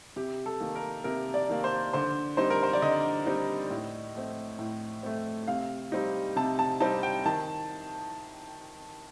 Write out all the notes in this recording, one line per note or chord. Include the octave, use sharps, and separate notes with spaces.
C3 G4
A4
D#3 A#3
A#4
C3 A#4
D5
D#3 A#3
C5
D3 C5
G3 C4 D#4 C5
A#4
C5
D5
D3 D#5
G3 C4 D#4
A2
A3 C4
A2
A3 C4
C3 F5
G3 C4 D#4
C3 A5
A5
G3 C4 D#4 A5
G5
D#3 A5